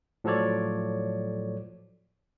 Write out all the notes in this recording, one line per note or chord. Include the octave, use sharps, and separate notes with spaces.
A2 F3 F#3 A4 C#5 D5